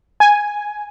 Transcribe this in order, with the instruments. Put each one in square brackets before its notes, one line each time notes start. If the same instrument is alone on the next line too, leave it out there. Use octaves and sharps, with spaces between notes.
[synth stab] G#5